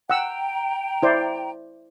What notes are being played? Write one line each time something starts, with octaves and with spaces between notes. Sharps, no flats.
F#5 G5 A#5 E6
E4 C5 D5